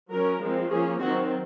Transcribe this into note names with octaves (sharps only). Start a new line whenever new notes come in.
F#3 C#4 A#4
F3 G#3 C4
F3 A#3 C#4 G#4
D#3 F#3 C4 F#4